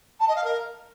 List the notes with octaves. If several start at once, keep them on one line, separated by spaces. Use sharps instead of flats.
A5
D#5
F5
A#4